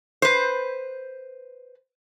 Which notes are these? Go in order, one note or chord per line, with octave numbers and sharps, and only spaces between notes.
B4 C5